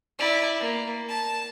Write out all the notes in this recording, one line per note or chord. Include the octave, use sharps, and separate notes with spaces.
E4 D5
A#3
A5